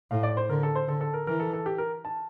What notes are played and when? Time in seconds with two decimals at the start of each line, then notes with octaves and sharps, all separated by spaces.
0.11 A2 F5
0.23 D5
0.37 C5
0.50 D3 A#4
0.63 A4
0.75 C5
0.88 D3 A4
1.01 A4
1.14 A#4
1.27 E3 A#4
1.40 A4
1.53 A4
1.66 G4
1.78 A#4
2.05 A5